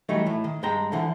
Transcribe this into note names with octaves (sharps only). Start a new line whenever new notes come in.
E3 F#3 G3 A3 D#4
A2
D#3
G2 G#3 G5 A#5
D3 E3 F3